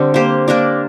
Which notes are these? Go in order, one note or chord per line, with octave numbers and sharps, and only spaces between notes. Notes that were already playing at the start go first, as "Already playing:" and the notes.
Already playing: D3 G3 C4 D4
A#3 G4 C5
A#3 D4 A#4 D5